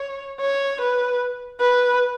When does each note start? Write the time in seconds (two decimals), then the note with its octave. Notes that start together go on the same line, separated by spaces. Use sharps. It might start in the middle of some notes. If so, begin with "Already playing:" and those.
Already playing: C#5
0.40 C#5
0.80 B4
1.60 B4